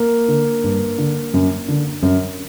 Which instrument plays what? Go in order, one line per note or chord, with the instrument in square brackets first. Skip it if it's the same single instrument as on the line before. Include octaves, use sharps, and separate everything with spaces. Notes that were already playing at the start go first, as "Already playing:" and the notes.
Already playing: [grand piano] A#3
D3
G2
D3
F#2
D3
F#2